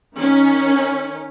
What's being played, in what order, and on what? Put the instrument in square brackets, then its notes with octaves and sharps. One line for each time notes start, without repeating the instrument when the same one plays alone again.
[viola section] D#3 C#4